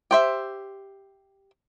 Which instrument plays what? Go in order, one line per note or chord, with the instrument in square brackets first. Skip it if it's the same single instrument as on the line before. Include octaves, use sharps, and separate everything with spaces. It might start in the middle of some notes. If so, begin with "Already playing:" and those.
[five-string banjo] G4 C5 E5